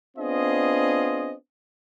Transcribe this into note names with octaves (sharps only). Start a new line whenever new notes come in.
B3 C4 D4 F4 G#4 D#5